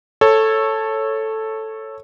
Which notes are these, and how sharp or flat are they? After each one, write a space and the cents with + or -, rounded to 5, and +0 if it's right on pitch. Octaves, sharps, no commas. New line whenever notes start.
A4 +0 C#5 -10